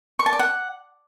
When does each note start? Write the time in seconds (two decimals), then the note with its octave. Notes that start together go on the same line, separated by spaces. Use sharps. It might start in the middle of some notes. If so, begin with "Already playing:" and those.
0.19 C#6
0.26 A5
0.33 D5
0.39 F#5